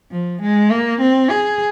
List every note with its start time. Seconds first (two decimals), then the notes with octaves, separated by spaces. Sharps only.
0.12 F3
0.42 G#3
0.71 A#3
1.01 C4
1.31 G#4